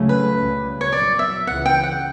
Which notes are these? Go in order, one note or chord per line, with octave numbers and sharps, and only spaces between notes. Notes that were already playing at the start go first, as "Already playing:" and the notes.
Already playing: C#2 C#3 F#3 A3 C#4
B4
C#2 C#3 G3
C#5
E2 B2 F#3 D5
E5
C#2 C#3 E3 F#5
G5
F#5